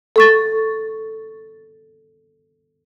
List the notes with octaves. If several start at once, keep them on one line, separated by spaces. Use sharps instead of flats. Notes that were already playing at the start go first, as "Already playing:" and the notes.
A4 C#6 A6